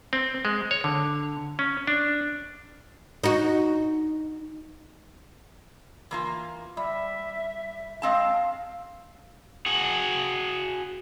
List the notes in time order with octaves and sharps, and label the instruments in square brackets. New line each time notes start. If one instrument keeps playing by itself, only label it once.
[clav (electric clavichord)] C4
G#3
C#5
D3
C#4
D4
[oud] D#4 F#4
[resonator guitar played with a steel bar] E3 A#3 F4
[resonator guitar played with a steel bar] G3 [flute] E5
[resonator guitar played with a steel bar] G#3 C4 A5 [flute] F5
[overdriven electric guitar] F#4 G#4